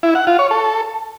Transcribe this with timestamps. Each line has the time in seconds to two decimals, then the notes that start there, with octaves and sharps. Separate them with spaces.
0.03 E4
0.15 F#5
0.27 F4
0.39 C#5
0.51 A4